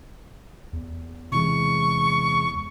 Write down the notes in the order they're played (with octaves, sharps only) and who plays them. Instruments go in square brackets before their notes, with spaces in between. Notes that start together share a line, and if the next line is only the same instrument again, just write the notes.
[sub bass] E2
[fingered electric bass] C3 E3 G#3 [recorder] C#6